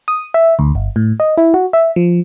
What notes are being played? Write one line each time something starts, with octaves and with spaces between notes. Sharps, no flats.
D#6
E5
D2
G1
A2
D#5
E4
F#4
E5
F3